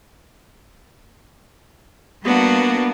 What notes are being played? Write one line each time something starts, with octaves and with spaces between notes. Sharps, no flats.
G3 A#3 B3 D4 F#4